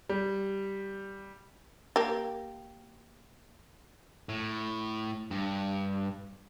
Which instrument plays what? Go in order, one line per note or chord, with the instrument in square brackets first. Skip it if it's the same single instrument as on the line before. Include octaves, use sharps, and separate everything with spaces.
[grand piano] G3
[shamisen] A#3 G4
[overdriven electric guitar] A2
G2